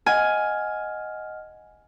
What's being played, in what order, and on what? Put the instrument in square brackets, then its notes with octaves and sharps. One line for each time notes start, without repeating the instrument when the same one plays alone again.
[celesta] D#5 F#5 F6 [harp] G#5